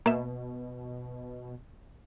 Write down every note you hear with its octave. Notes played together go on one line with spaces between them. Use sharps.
B2 A#3 E5